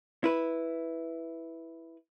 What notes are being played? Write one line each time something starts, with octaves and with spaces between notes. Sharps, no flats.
E4 B4